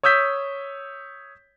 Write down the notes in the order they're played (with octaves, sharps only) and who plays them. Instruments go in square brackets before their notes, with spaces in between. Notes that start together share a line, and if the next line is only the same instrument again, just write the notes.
[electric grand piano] C#5 D#6 E6 G6 B6